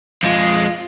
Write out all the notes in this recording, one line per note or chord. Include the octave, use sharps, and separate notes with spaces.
F2 G#3 F4